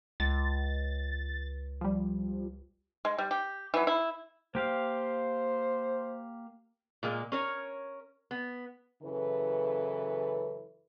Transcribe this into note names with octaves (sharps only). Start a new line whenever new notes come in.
C#2 A6
F3 G3
G#3
G3
G4
E3 F#3
E4
A#3 G4 C5 F5
A#2 G#3 A#3
C#4 A#4 C#5
B3
F#2 C#3 E3 E4 A4 B4